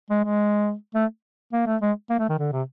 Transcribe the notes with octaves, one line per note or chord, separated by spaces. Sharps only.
G#3
G#3
A3
A#3
A3
G#3
A#3
A3
D#3
D3
C3